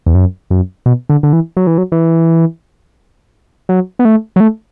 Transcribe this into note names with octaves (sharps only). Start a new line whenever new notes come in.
E2
F#2
F#2
B2
D3
D3
E3
F#3
E3
F#3
E3
F#3
B3
A3
F#3
A3